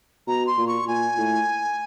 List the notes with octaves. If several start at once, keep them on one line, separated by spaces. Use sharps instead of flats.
B2 A#5
C6
A#2
C#6
A#2 G#5
A2